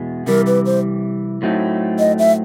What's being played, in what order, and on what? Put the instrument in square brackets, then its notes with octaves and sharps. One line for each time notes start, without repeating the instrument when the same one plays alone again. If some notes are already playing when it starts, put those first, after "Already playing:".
Already playing: [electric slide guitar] E2 B2 G#3 B3
[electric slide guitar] C3 E3 G3 [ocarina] A#4
[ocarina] B4
C5
[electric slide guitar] A2 F#3 A3 C4 D#4
[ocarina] D#5
E5